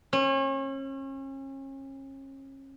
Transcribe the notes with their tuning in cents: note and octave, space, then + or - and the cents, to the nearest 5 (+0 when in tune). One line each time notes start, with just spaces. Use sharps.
C#4 -35